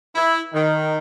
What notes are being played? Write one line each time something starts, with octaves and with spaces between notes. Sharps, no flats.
E4
D#3